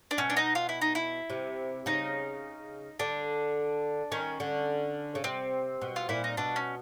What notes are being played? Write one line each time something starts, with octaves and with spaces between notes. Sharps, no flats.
D4
B2 C#4
D4
D#4
F4
E4
D#4
E4
C3
C#3 D#4
D3 D4
D#3 C#4
D3
C#3
C3 C4
B2
F4
A#2 E4
D#4
B2 D4
C#4